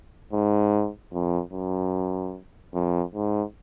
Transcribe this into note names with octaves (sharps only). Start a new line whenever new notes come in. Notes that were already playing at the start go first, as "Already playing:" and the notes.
G#2
F2
F#2
F2
G#2